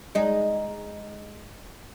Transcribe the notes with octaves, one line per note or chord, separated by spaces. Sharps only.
G#3 D#4